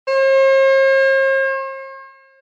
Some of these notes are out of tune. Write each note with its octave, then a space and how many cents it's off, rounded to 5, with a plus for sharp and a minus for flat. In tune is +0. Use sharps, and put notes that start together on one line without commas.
C5 +45